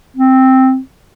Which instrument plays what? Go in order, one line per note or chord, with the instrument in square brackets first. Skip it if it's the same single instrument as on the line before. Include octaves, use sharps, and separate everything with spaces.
[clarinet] C4